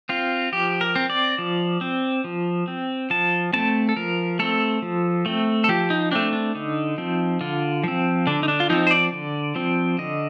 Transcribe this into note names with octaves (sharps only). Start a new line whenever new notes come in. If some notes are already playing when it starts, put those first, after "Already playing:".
C4 F4
F3 G4
A#4
C4
D5
F3
C4
F3
C4
F3 A5
A3 C4 A5
A4
F3 A#4
A3 C4 A4
F3
A3 C4
A4
F3 G4
D#4
A3 C4 D4
D4
D3 D#4
F3 C4
D3 F4
F3 C4
D3 D4
D#4
D4
F4
F3 C4 D#4
C5
D5
D3
F3 C4
D3 D#5